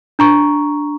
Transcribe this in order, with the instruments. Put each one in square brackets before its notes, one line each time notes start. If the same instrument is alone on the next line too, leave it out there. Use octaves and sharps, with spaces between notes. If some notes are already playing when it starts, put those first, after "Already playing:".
[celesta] D4 A#5 C#6